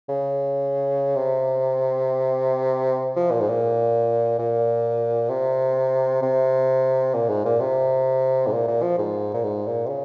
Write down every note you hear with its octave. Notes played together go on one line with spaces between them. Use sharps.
C#3
C3
F3
A#2
G#2
A#2
A#2
C3
C3
A#2
G#2
A#2
C3
G#2
A#2
A#2
F3
G#2
A#2
G#2
A#2
C3
C#3